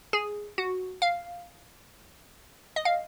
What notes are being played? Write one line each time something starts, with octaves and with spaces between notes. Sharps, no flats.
G#4
F#4
F5
D#5
F5